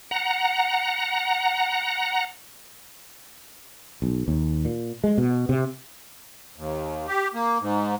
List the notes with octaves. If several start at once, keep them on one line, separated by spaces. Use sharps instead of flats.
F#5 A#5
B1
D#2
A#2
G#3
B2
C3
D#2
G4
A#3
G#2